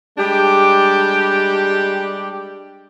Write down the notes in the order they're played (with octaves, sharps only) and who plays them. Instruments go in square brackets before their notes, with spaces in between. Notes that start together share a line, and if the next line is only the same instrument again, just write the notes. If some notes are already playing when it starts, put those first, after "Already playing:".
[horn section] G3 G#3 D4 G4